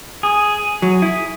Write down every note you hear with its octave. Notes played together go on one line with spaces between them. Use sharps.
G#4
F#3
E4